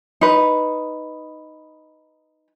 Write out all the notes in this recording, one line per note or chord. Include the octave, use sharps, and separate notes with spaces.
D#4 B4